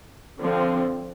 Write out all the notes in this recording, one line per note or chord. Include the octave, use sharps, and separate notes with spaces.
D3 F3 C4